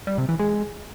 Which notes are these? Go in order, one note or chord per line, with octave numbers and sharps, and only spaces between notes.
G3
C3
E3
G#3